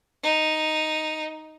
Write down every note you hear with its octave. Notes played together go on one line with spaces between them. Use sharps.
D#4